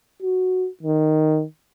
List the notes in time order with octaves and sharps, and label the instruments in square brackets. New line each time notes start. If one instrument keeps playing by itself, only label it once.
[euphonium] F#4
D#3